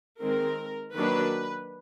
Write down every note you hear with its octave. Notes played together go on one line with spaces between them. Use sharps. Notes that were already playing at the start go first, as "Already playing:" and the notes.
D#3 G#3 C4 A#4
D#3 F#3 A#3 D4 B4